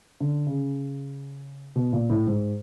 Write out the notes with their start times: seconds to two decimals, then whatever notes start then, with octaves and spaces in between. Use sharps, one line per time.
0.20 D3
0.47 C#3
1.76 B2
1.93 A#2
2.10 A2
2.27 G#2